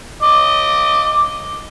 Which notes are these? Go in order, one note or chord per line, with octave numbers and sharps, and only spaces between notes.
D#5 D6